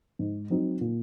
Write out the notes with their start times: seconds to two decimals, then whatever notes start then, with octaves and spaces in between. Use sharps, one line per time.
0.19 G#2
0.50 F#3 C4 D#4
0.81 A#2